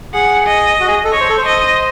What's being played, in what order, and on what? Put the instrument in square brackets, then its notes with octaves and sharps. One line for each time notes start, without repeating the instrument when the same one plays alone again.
[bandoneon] G#4 [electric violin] F#5
[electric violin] D#5
[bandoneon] F#4
G#4
A4
[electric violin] C#5 [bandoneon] D#5
[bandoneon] C5
A4
C5
[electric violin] D#5